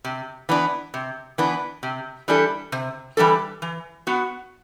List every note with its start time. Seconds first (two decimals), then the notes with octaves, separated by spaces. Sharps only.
0.05 C3
0.49 E3 B3 D4
0.94 C3
1.38 E3 B3 D4
1.83 C3
2.28 E3 G3 D4 A4
2.72 C3
3.17 E3 G3 D4 A4
3.62 E3
4.07 B3 F#4